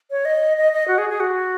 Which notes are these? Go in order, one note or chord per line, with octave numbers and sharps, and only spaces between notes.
C#5
D#5
D#5
D#5
F#4
G#4
G#4
F#4